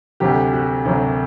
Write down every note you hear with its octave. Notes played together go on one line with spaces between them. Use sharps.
D2 C3 F#3 G4
F#4
D2 C3 F#3